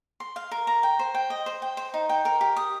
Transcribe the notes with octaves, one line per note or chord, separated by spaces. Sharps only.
C6
F5
A#4
A#5
G5
C5
G5
D#5
C5
G5
C5
D#4
G5
A#4
G4
D#6